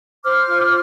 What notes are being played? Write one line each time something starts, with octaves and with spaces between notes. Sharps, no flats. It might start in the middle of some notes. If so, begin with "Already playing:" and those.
C5 D6 F6
F4